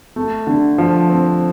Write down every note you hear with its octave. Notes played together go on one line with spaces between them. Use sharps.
A3
D3
F3
C4